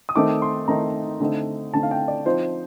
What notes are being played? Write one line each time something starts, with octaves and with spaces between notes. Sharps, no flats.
D#6
D#3 A3 C4 D#4 D6
C6
D#3 A3 C4 D#4 A#5
D3 A3 C4 D#4
D3 A3 C4 D#4 A5
F5
G5
D5
F3 C4 D#4 C5